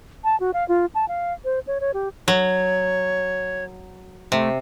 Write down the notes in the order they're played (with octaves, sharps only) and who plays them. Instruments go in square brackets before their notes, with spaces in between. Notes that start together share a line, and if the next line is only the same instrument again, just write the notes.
[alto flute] A5
F#4
F5
F4
A5
F5
C5
C#5
C#5
G4
[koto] F#3 [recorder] C#5
[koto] C3 [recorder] A3